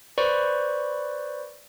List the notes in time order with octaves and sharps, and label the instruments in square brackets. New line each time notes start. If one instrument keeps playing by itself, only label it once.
[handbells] B4 C5 D5 B5 C#6